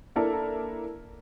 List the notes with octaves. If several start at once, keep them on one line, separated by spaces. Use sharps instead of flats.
A#3 D4 E4 A4 A#4